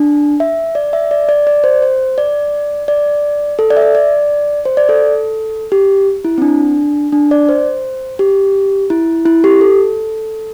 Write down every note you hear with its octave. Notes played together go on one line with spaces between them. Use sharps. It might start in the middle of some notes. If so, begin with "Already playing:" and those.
Already playing: D4
E5
D5
E5
D5
D5
D5
C5
C5
D5
D5
A4
D5
E5
D5
D5
C5
D5
A4
G4
E4
C4
D4
D4
D5
C5
G4
E4
E4
G4
A4